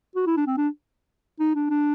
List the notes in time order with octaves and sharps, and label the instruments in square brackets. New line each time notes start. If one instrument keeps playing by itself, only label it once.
[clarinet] F#4
E4
D4
C4
D4
D#4
D4
D4